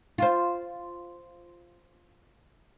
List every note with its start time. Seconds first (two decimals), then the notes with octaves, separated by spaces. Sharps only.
0.18 F4 C5